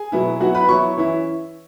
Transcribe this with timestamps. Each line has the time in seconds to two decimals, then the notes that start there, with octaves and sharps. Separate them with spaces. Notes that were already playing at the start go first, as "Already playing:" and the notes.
Already playing: G#4 G#5
0.12 B2 F#3 B3 E4
0.40 F#3 B3 E4 F#4 F#5
0.55 B4 B5
0.69 F#3 B3 E4 C#5 C#6
0.97 E3 C#4 E4